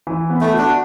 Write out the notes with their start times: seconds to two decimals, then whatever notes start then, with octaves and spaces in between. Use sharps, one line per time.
0.07 E3
0.30 B3
0.41 A3
0.53 D4 F#4